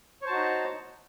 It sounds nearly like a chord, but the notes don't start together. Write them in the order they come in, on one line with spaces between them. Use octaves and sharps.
C#5 C5 A5 F#4 D#4